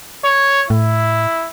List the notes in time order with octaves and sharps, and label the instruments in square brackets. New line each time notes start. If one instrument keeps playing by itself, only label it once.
[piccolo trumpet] C#5
[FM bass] A2 [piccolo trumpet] E4